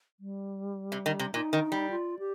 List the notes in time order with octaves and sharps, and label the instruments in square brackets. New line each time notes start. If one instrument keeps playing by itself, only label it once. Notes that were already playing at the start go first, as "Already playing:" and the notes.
[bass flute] G3
[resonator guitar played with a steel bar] C3
D#3
C3
[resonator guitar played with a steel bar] A#2 [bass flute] D#4
[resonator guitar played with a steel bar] D#3
G3
[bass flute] F4
G4